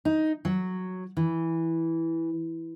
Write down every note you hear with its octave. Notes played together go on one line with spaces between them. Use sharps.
D#4
F#3
E3